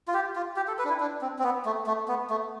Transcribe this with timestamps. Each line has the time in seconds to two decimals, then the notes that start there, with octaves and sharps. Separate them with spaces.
0.08 F4
0.14 G4
0.36 F4
0.56 G4
0.68 A4
0.79 B4
0.85 D4
0.89 E4
1.00 D4
1.21 C4
1.39 C4
1.44 B3
1.65 A3
1.87 A3
2.08 B3
2.30 A3